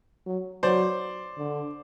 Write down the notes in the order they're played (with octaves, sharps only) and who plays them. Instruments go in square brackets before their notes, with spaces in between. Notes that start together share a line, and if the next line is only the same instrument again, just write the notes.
[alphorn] F#3
[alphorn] F#3 [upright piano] C5 D5
[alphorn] D3